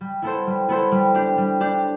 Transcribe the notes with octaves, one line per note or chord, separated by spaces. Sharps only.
G3
B3 E4 A4 C5
G3
B3 E4 A4 C5
G3
D4 G4
G3
D4 G4